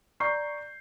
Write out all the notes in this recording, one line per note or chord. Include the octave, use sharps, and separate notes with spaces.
D5 A#5 C#6 G6 C7